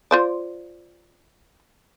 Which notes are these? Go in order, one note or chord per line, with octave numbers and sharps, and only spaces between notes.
F4 C5 D5